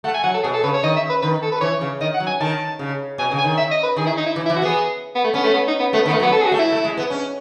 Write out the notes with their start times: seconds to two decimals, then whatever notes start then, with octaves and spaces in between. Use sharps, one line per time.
0.04 A3 F#5
0.14 G#5
0.24 F#3 F#5
0.34 A4
0.43 B2 G#4
0.54 A4
0.64 C#3 B4
0.74 C#5
0.83 D#3 D#5
0.96 E5
1.09 B4
1.22 D#3 B4
1.42 A4
1.52 B4
1.61 E3 C#5
1.81 C#3
2.01 D#3 D#5
2.14 F#5
2.20 F#3
2.27 G#5
2.41 D#3 A5
2.79 C#3
3.18 B2 G#5
3.31 C#3
3.38 G#5
3.44 D#3
3.57 E5
3.71 D#5
3.83 B4
3.96 D#3 G#4
4.07 E4
4.17 D#4
4.26 E4
4.36 E3
4.46 E4
4.50 E3
4.56 F#4
4.62 B3 G#4
5.15 B3
5.24 A3
5.34 B3 C#4
5.44 A3
5.54 B3
5.67 D#4
5.80 B3
5.93 A3 B3
6.06 D#3 B3
6.12 A3
6.20 F#3
6.22 B3
6.32 A4
6.41 G#4
6.46 F#4
6.52 A3
6.59 E4
6.72 A3
6.85 G#3
6.97 B3
7.10 C#4